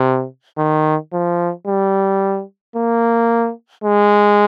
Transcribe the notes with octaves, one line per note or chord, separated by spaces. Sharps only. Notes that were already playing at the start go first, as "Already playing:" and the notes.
Already playing: C3
D#3
F3
G3
A#3
G#3